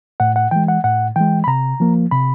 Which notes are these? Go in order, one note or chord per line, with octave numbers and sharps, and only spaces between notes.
A2 F#5
F#5
E3 G#3 G5
F#5
A2 F#5
E3 G#3 G5
B5
C3 A#5
F3 A#3
C3 B5